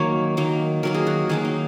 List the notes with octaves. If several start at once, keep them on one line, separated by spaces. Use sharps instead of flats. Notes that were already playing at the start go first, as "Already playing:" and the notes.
Already playing: D#3 F#3 A#3 C#5
D#3 F#3 A#3
D#3 F#3 A#3 A#4
G#4
F#4
D#3 F#3 A#3 G#4
D#4